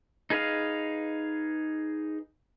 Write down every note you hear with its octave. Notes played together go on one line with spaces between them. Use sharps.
D#4 G#4 B4 D#5 F5